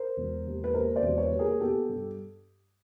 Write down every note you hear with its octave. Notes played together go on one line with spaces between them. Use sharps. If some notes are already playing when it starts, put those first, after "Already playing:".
Already playing: A#4 C5
E1
D#2
B4
D#2 A#4 C5
C5 D5
E1
B4 C#5
D#2
G#4 A#4
B3 G4 A4
G2